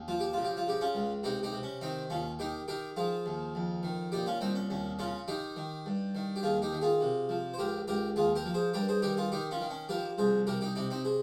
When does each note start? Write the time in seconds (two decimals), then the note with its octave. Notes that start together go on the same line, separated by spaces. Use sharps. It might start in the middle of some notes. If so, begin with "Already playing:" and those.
Already playing: D#2
0.08 F3 F4
0.20 G4
0.33 C#3 F4
0.44 G4
0.57 F4
0.67 C#3 G4
0.81 C#4 F4
0.95 C#2
1.23 C3 D#4 G4
1.43 D#4 G4
1.52 C3
1.63 C#4
1.81 D#3 C4 D#4
2.10 D#2 C#4 F4
2.39 D#3 D#4 G4
2.68 D#3 G4 A#4
2.96 F3 F4 G#4
3.26 D#2
3.55 F2
3.83 D#3
4.12 A#2 D#4 G4
4.26 C#4 F4
4.41 C2 C4 D#4
4.55 C#4
4.70 D#2 C#4
4.99 C#3 C#4 F4
5.28 D#3 D#4 G4
5.56 D#3
5.86 G2
6.15 D#3
6.36 G4
6.43 D#2 F4 G#4
6.62 D#4 G4
6.73 D#3
6.81 F4 G#4
7.01 C3
7.29 F3
7.54 C5
7.58 C#2 G4 A#4
7.88 C#2 G4 A#4
8.16 D#2 F4 G#4
8.35 G4 A#4
8.45 F3
8.54 G#4 C5
8.73 G2 G4 A#4
8.88 G#4 C5
9.02 D#3 G4 A#4
9.17 F4 G#4
9.32 D#3 D#4 G4
9.51 C#4 F4
9.60 D#3
9.70 C#4
9.89 F3 G4 A#4
10.18 C2 G#4 C5
10.47 C3 G4 A#4
10.61 D#4 G4
10.75 C3 D#4 G4
10.90 C4 D#4
11.05 G#4 C5